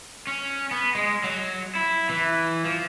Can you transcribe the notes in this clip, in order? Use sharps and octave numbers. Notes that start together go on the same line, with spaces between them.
C#4
B3
G#3
F#3
E4
E3
F3